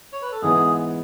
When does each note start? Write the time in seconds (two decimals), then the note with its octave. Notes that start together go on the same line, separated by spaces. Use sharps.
0.13 C#5
0.22 B4
0.32 A4
0.42 G#2 E3 B3 G#4